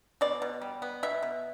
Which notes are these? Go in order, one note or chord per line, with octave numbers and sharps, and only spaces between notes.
B2 D5
B2
G3
B3
B2 E5
B2